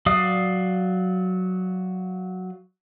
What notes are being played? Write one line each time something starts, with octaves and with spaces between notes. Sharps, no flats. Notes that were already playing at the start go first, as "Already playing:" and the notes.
F#3 D5 F5 D#6